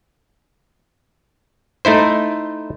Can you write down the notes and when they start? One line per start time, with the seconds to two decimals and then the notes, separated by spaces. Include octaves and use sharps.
1.85 A3 D#4 E4 C5